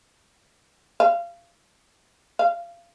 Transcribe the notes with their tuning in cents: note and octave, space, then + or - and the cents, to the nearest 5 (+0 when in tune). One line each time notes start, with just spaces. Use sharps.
F5 -25
F5 -25